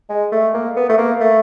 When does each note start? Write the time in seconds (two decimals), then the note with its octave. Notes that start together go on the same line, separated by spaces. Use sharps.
0.10 G#3
0.32 A3
0.54 A#3
0.76 B3
0.89 A3
0.98 A#3
1.20 A3